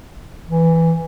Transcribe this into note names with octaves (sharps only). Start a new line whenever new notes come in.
E3